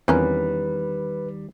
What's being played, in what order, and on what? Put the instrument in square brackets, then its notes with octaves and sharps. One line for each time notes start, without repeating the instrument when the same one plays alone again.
[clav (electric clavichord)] E2 [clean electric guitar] D#3 G3 [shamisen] C4 C#4 A#4 [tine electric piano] B4